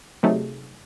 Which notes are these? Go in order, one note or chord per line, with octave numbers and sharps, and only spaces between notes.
C3 F#3 A3 D#4 G#4